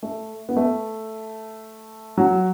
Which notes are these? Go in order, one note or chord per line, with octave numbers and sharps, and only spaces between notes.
A3
B3
A3
F#3